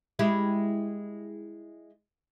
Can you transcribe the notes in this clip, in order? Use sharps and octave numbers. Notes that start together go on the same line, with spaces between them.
G#3 E4 G4